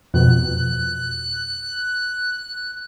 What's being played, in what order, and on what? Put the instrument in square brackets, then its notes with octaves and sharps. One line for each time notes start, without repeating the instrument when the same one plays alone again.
[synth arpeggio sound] F2 B2 [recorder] F#6